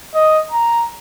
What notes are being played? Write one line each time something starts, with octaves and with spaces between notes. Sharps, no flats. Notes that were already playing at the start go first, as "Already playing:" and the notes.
D#5
A#5